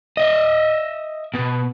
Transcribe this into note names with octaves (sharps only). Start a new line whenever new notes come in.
D#5 E5
B2